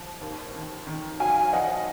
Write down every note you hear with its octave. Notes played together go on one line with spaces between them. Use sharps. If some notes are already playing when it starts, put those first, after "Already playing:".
Already playing: F3
D#2
D#3
D#3
F#3 F5 G#5
F3 D#5 F#5